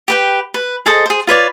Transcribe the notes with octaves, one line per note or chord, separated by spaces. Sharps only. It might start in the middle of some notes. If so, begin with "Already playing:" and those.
G4 B4 G5
B4
G#4 A4 C5 D#5
G#4 C5
F4 B4 C#5 D5